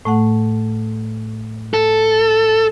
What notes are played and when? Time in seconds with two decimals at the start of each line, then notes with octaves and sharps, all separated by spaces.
0.05 A2 A3 F#5
1.74 A4